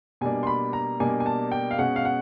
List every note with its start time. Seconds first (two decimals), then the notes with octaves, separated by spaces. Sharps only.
0.21 B2 G3 A#3 D4 G#5
0.43 C6
0.47 B5
0.73 A#5
1.00 B2 G3 A#3 D4 G#5
1.20 G#5
1.26 A5
1.52 G5
1.71 F5
1.78 B2 G#3 C#4 F#5
1.96 F5
2.05 F#5